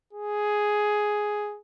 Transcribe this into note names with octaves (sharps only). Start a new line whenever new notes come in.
G#4